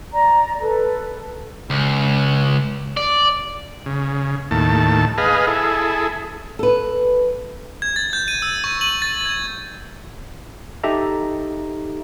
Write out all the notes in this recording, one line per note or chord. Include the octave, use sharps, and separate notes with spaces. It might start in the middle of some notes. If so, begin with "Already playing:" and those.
D5 A#5
A4 B4
C#2
D5
C#3
D#2 A2 A5
G#4 B4 D#5 F5
E4 G#4 A4
A4 B4
G#6
A6
G6
D#7
E6
C#6
F#7
A6
G#6
D#4 G4 A4 E5 A#5